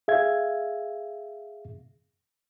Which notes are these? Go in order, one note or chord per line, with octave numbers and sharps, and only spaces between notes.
G#4 E5 F5 G#6